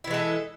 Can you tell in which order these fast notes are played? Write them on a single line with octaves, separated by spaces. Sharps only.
E4 E3 G#3 A4